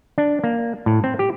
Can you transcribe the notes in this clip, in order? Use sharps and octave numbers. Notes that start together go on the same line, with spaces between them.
D4
A#3
A2
C4
G4